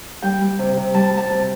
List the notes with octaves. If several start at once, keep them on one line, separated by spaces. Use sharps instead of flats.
G3 G5
G3
C3
C3
G3 A5
G3 A5
C3